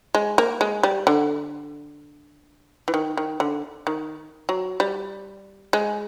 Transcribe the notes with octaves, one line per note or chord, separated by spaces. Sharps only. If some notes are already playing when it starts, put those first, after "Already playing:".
G#3
A#3
G#3
G3
D3
E3
D#3
D#3
D3
D#3
F#3
G3
G#3